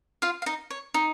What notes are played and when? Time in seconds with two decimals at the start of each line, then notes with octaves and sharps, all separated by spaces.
0.22 F4 F5
0.42 F5
0.46 D#4 D#5
0.70 C#5
0.94 D#4